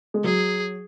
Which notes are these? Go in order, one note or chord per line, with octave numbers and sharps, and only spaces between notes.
G#3
F#3 G#4